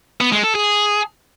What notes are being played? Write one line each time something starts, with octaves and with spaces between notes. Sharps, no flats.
B3
G#3
A4
G#4